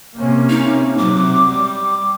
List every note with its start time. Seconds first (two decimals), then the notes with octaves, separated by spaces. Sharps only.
0.18 C3 A#3 C#4
0.49 D#4
0.98 C3 F#3 D6
1.50 G3